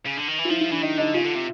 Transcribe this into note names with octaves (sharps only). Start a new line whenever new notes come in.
C#3
D3
D#3
E3
F4
F3 E4
E4
E3 D4
D#3 D#4
D3 D#4
C#3 F4
D3
C3